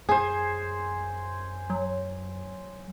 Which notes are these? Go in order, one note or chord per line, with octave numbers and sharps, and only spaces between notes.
F#2 G#4 C5 G#5
F#3